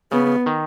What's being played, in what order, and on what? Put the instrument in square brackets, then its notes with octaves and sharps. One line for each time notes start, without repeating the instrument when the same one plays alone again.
[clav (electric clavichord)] C#3 [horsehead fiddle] B3
[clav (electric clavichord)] D#3